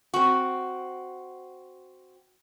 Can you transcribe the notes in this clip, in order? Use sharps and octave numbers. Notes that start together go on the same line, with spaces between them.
C4 F#4